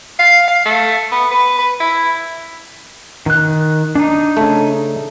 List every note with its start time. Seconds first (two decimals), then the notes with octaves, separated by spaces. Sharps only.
0.19 F5
0.48 F5
0.65 A3
1.12 B3
1.31 B4
1.59 B4
1.80 E4
3.26 D#3 F#6
3.95 D4 D#4
4.37 C#3 A3